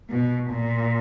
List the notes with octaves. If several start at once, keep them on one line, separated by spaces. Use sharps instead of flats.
B2
A#2